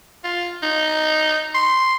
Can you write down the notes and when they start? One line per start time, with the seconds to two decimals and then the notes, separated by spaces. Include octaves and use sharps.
0.24 F4
0.63 D#4
1.54 C6